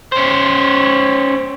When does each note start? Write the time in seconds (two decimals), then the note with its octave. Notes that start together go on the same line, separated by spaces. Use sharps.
0.12 C#4 C5